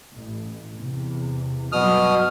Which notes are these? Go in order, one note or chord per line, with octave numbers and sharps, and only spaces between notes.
A1
E2 C3
G2 B2 F#3 D#6 F6